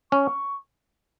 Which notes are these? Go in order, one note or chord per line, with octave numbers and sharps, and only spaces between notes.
C#4 C#6